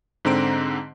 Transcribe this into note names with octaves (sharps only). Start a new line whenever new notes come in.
G#2 D3 C4 A#5 D7